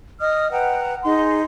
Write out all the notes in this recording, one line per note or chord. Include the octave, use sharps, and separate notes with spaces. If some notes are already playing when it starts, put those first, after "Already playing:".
D#5 D#6 F6
B4 F#5 G5 A#5
D#4 G#4 C6